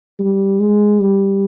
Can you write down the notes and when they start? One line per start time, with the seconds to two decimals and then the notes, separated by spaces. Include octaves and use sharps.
0.19 G3
0.60 G#3
1.00 G3